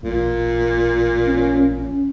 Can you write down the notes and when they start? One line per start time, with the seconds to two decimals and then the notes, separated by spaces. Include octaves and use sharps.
0.03 A1 A#2
1.26 C#4
1.68 C#4